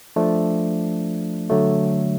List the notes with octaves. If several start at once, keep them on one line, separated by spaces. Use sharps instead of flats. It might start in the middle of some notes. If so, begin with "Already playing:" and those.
F3 A3 D4
D3 F#3 A3